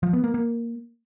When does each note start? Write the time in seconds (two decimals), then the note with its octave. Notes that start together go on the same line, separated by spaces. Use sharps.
0.03 F3
0.13 B3
0.24 A#3
0.34 A#3